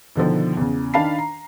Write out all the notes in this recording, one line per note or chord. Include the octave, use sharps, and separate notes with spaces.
B2 D3 D#3 F3
E2 C#3
D#3 D4 F5 A5 B5 C7
A#5